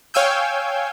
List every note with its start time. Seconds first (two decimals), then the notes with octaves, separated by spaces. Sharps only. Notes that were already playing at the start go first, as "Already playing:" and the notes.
0.14 C#5 F5 G5 G#5 E6 G6